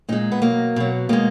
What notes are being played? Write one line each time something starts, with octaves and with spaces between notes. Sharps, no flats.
A#2 G#3 D#4
B3
B2 F#3 A#3
B2 F#3
B2 G#3 A#3